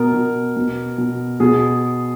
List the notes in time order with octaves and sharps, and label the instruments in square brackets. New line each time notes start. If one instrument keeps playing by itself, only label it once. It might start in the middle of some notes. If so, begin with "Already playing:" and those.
Already playing: [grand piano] B2 A#4
B2
B2
B2
B2 G#4